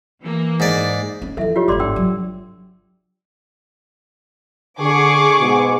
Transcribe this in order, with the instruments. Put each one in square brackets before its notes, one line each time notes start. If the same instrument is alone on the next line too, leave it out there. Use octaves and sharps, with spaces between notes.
[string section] E3 A#3
[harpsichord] G#2 D5
[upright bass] C#4
[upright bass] E3 F3 [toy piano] A4 E5
[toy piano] F4 G4 C#5
[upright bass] G1 G#2 [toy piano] D5 C6 D6
[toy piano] D4 G5 E6
[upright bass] F#3
[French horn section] D3 [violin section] G#4 C#6 D6
[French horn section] G#2 B2